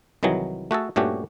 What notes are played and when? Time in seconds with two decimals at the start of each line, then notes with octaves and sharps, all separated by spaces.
0.23 C2 D#3 E3 F#3 G#4
0.71 A3 F#4 G#4 A4
0.96 G2 A#2 A3 C#4 F#4 G4